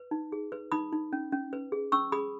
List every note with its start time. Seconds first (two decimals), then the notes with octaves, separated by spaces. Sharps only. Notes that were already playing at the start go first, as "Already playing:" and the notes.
Already playing: B4
0.11 D#4
0.32 G#4
0.52 B4
0.72 D#4 B5 D#6
0.93 D#4
1.13 C#4
1.32 C#4
1.53 B4
1.72 G#4
1.92 C#4 C#6 E6
2.12 G#4 B5 D#6